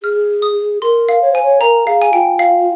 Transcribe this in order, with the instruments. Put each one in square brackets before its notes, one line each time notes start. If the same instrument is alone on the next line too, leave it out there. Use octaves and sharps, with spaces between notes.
[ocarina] G#4 [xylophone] F6
[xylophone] D#6
[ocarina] A#4 [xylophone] C6
[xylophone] F5
[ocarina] C#5
[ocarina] C5 [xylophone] G#5
[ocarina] C#5
[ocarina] A#4 [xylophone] A#5
[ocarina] G#4 [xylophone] F5
[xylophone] G#5
[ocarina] F4 [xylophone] G5
[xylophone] F5